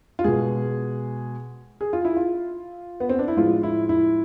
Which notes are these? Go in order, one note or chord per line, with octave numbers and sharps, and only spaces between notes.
F4
B2 G#3 G#4
G#4
F4
E4
F4
B3
C4
D4
E4
A2 F3 G#3 F4
E4
E4